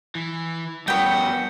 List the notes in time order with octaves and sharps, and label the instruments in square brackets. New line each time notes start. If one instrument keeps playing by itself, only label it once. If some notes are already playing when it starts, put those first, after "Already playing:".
[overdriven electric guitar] E3
[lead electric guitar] G2 F#4 [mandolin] B3 G5 [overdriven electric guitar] F#5